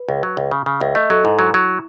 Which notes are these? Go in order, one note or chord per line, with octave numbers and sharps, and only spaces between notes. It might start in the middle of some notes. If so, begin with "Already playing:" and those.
Already playing: B4
C#2
F#3
C#2
C#3
C#3
C#2 E5
A3 D#5
F#3 A4
G#2 E4
F#3
F#3